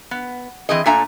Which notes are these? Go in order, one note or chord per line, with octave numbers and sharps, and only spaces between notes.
B3
E3 C4 G#4 D#5
A#2 A3 D4 E5 G#5 A#5